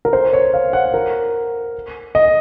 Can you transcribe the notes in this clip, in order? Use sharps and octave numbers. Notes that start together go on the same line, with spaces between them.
A#4
C5
C#5
F5
F#5
A#4
D#5